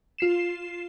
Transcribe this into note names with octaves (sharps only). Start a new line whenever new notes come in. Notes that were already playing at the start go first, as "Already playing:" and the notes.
F4 C7 E7